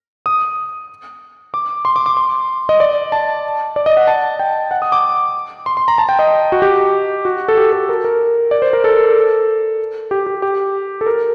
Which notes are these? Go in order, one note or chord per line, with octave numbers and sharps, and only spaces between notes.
D#6
D6
C6
D6
D6
C6
D#5
D5
A5
D5
D#5
F#5
A5
G5
F#5
D#6
D6
C6
C6
A#5
A5
G5
D#5
F#4
G4
F#4
A4
G4
A4
A#4
A#4
D5
C5
A#4
A4
G4
G4
G4
A4
A#4